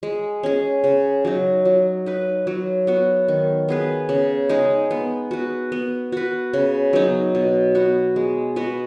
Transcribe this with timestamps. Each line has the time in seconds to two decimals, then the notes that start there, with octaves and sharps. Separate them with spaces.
0.03 G#3
0.43 C#4 G#4
0.84 C#3
1.25 F#3 D#4
1.65 F#3
2.06 D#4 B4
2.47 F#3
2.87 B3 F#4
3.28 D#3
3.69 B3 G#4 B4
4.09 C#3
4.49 G#3 D#4 G#4
4.91 B3
5.31 F#4 B4
5.72 B3
6.12 F#4 B4
6.53 C#3
6.93 F#3 B3 D#4
7.35 B2
7.75 B3 F#4
8.16 G#3
8.56 B3 F#4 B4